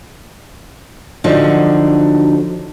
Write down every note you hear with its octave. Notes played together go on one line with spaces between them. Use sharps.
D3 F3 F#3 D#4 F#4